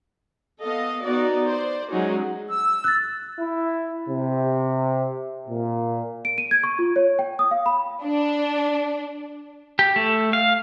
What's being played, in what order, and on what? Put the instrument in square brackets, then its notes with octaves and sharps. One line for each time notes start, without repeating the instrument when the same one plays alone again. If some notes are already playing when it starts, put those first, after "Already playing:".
[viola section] B3 A4 D#5 F5
B3 D#4 F#4 D5
C5 D5
F#3 G#3 C#4 D#4 F#4 G#4
[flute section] E6
[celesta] F#6 A6
[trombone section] E4
C3
A#2
[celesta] D7
D#7
G#6
C#6
F4
C#5
G5
D#6
F5
B5
[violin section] D4
[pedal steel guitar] G4
A3
F5